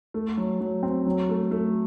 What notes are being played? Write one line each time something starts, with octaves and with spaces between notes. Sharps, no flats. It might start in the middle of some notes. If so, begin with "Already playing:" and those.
A3
F#3
F#3
C4
F#3
A3
A3